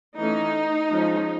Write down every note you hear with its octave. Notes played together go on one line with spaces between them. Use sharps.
E3 A3 C#4 D#4
F3 G#3 C#4